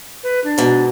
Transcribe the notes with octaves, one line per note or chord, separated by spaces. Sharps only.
B4
D4
G#2 B2